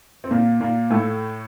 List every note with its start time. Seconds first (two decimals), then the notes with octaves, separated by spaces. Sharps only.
0.24 C4
0.31 A#2 A#3
0.61 A#2 A#3
0.90 A2 A3